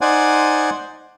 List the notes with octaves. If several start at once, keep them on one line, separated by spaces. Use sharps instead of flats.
D#4 C5 D5 F#5 G#5